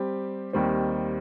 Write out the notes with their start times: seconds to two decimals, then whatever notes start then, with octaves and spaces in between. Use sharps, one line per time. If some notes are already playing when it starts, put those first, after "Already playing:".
Already playing: G3 C4 G4
0.53 D#2 D#3 G3 C4